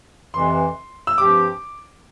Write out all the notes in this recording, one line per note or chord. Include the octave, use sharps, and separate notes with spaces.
F2 C3 E3 C6
E6
G2 F3 C4 G4 D6